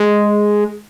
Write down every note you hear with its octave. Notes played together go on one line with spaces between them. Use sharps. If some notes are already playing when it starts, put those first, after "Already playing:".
Already playing: G#3